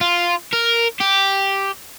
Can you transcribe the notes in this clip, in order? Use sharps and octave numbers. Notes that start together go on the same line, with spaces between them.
F4
A#4
G4